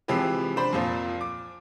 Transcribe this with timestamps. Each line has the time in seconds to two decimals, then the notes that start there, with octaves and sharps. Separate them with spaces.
0.08 C3 E3 F3 G#3 G4 B4
0.56 D4 C5 B5
0.73 F2 A#2 F3
1.21 D6